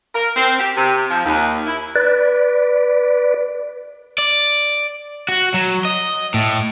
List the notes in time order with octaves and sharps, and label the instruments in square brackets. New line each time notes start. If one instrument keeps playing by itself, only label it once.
[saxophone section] A#4
C4
G4
C3
F3
D#2
E4
[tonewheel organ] B4 D5
[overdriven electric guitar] D5
F#4
F#3
D#5
A2